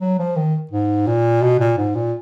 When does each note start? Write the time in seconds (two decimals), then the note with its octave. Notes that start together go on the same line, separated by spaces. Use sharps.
0.01 F#3
0.19 F3
0.36 D#3
0.71 G#2
1.07 A#2
1.42 B2
1.60 A#2
1.78 G#2
1.95 A#2